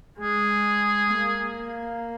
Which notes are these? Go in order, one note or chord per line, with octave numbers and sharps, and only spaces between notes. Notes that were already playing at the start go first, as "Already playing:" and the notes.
G#3 G#4
A#3